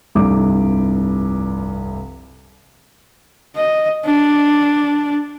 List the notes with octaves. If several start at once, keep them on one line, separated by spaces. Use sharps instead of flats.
F1 C2 G2 D6
D#5
D4